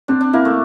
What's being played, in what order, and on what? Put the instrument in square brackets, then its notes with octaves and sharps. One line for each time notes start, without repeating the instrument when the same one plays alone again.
[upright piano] C4 [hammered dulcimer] D4
[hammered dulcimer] D4
[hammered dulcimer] A#3 [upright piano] E4
[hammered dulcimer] A3